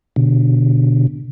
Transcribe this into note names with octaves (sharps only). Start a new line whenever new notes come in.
B2 D3